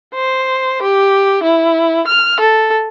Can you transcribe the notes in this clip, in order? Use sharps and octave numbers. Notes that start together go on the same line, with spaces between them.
C5
G4
E4
F6
A4